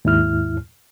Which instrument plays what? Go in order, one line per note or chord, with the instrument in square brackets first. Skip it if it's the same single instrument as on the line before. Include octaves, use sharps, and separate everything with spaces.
[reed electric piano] D#2 G#2 E4 F6